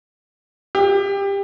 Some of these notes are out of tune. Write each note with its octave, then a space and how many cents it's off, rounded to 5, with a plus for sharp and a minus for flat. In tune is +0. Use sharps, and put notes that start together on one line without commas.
G4 +25